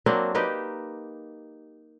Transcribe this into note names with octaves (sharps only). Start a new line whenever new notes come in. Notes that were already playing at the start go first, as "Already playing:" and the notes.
F#3 A#3 C4 D4
A#3 D#4 G4 B4